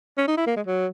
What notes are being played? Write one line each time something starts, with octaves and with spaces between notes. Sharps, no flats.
C#4
D#4
E4
A#3
G#3
F#3